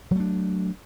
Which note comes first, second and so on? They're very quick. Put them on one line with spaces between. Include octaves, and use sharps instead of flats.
F#3 A3 D4